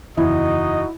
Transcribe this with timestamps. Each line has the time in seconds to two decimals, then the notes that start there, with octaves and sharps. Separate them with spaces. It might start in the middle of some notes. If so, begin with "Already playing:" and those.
0.17 F#1 E2 D#4 E4 F#4 D#5